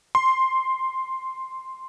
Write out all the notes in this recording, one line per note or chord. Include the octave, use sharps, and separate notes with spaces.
C6